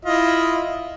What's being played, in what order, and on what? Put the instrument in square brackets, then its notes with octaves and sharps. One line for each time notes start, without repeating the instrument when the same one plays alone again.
[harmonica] E4 F4 D#5